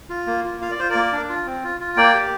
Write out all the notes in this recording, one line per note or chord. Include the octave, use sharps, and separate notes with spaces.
F4
A#3
F4
F4 F5
D5
F4 C5
A#4 D5
A#3
D4
F4
C4
F4
F4
A#3 D5 G5
G4